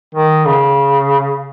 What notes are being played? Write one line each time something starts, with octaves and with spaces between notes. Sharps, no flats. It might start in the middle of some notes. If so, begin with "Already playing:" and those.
D#3
C#3